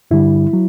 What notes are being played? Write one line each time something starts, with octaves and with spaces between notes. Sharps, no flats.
G2 D3 G3 E4
F#3